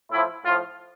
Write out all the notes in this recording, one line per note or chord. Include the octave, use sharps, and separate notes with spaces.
A2 F3 E4
A2 F3 F4